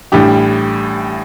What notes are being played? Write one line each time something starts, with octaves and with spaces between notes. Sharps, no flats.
A1 A2 G3 D4 G4